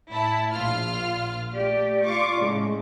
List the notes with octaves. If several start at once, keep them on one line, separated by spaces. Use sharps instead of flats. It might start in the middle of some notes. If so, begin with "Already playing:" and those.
A2 E4 A5
A#1 F4 F6
A3 G4 D5
F4 C#6 D6
A2 C#3 G#3